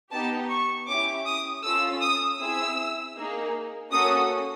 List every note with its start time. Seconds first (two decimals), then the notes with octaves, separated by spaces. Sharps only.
0.11 B3 D#4 G4 A5
0.50 C#6
0.87 C#4 E4 G4 D6
1.26 D#6
1.63 C#4 F4 A4 E6
2.02 D#6
2.40 C4 E4 G#4 E6
3.16 A#3 D#4 G#4
3.91 A#3 C#4 F#4 A4 D#6